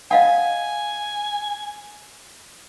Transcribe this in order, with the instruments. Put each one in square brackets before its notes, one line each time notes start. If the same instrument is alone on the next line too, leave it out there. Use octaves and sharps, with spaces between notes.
[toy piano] D#5 F5 F#5 [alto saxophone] G#5